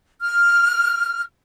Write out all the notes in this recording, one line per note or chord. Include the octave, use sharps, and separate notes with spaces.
F6